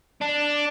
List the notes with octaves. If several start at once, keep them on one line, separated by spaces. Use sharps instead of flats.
D4